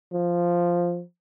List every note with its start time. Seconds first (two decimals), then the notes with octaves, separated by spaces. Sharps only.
0.13 F3